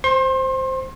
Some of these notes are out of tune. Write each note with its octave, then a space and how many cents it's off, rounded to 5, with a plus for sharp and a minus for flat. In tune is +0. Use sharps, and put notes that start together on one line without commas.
C5 +0 C6 +35